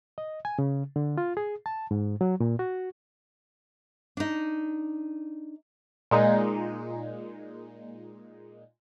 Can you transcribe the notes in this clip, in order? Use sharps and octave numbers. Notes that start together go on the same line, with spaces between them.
D#5
G#5
C#3
D3
F4
G#4
A5
G#2
F#3
A#2
F#4
D4 D#4
A#2 G#3 D#4